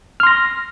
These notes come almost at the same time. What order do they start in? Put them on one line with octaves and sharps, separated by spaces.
F6 C6 A#6